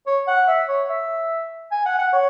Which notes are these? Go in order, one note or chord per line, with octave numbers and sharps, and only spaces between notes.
C#5
F#5
E5
C#5
E5
G#5
F#5
F#5
C#5